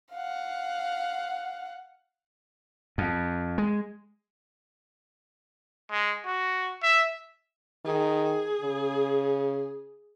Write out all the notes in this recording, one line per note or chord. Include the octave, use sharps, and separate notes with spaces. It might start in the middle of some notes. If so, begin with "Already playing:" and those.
F5 F#5
F2
G#3
G#3
F#4
E5
D#3 G#4
C#3